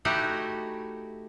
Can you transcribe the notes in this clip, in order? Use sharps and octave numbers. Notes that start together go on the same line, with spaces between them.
A3 D#4 E4 F#4 G4